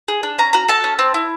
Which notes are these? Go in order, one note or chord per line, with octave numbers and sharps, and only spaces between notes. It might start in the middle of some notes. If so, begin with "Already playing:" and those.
G#4
D4
C#4 A#5
F#4 A#5
A4 A5
C#4
C4
E4